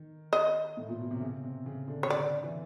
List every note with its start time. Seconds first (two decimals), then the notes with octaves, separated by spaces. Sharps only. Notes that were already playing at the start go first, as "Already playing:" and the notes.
Already playing: D#3
0.33 D#5
0.77 A2
0.89 A#2
0.99 B2
1.11 C3
1.21 C#3
1.43 C3
1.66 C#3
1.88 D3
2.03 C#5
2.10 D3 D5
2.43 E3